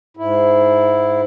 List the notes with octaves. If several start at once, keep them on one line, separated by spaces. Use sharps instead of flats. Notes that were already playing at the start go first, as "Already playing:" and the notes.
G#2 E4